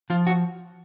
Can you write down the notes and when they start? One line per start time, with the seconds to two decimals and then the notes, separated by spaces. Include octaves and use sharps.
0.10 F3 F4
0.27 F#4